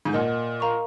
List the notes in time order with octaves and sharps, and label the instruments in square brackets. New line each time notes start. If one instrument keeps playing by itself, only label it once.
[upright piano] G#2
[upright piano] A#2 [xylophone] A#4 D#5 F#5
[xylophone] A#4 F5 A#5 C#6